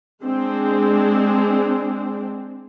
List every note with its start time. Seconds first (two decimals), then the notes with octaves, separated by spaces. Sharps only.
0.23 G#3 C4 D4